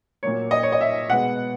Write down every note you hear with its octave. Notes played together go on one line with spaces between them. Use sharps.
A#2 F#3 A#3 C#5
D#5
C#5
D#5
E5
B2 G#3 B3 F#5